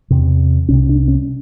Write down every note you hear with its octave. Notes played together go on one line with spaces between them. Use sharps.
E2 C3
C2 C3 C#4
D4
C#4